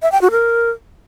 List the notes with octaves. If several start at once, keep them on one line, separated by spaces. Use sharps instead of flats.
E5
G5
F#4
A#4